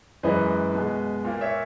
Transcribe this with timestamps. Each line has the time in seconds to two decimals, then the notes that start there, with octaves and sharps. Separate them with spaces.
0.23 F#2 E3 G#3 B4 D#5
0.73 B2 G#3
1.24 A#2 A#3
1.41 C#5 E5